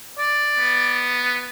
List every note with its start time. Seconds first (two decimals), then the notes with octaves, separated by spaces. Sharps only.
0.18 D5
0.58 B3